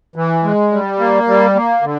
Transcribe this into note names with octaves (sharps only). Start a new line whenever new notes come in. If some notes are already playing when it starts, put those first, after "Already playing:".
E3
G#3
G3
A#3
G3
A#3
D3